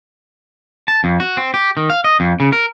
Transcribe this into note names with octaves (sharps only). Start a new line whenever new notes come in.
A5
F2
F#4
C4
G4
D#3
F5
D#5
F2
C#3
A#4